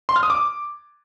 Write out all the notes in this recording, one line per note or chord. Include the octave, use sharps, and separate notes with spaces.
C6
F6
D#6
D6